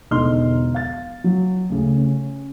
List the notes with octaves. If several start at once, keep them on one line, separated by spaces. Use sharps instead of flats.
E1 D3 D#4 C6 F6 G7
F5 A6
F#3
D2 C#3
C#4